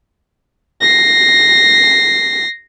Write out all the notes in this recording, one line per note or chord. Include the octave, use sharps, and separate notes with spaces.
A#6 C7